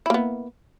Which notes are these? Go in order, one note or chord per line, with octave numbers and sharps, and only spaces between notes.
A#3 B3 E4